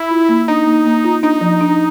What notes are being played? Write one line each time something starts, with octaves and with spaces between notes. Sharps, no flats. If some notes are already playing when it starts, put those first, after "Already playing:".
Already playing: E4
F4
A#3
D4 D#4
A#3
A#3
F4
D4 D#4
F3
D4